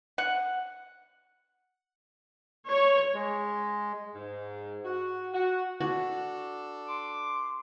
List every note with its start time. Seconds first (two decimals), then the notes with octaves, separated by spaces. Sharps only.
0.18 F#5
2.69 C#5
3.13 G#3
4.15 G#2
4.84 F#4
5.33 F#4
5.80 D4 F#4 A4
6.88 C6 D6